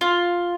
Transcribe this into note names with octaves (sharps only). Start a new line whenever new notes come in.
F4